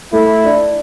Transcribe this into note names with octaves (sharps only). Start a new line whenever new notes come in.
A3 E4
D4